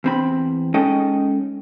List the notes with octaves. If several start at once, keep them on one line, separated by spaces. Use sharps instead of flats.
E2 C4 B5
G#3 C#4 D#4 A4 D#5 G5